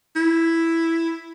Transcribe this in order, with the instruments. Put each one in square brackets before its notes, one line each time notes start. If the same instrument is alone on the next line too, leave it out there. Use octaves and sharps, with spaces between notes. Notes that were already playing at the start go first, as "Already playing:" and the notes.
[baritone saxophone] E4